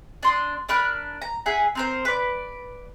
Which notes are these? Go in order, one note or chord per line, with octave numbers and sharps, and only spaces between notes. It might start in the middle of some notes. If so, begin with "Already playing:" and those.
D4 C6 D#6
D4 A#4 B5 F#6
A#5
G#4 E5 F#5
C4 A#4 C5
B4 D5